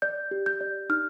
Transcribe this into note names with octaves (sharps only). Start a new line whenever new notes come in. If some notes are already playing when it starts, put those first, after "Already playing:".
D5 G6
G4
G6
D5
D#4 F6